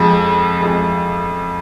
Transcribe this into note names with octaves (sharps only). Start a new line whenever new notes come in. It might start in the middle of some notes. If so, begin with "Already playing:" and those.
Already playing: F2 F3 G#3
F2 F3 G#3